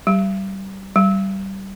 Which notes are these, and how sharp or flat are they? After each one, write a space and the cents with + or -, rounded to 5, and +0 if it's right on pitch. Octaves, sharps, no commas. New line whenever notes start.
G3 -25
G3 -20